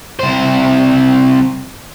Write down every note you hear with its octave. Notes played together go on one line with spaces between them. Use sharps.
C2 C5